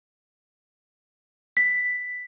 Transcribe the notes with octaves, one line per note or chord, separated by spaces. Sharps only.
B6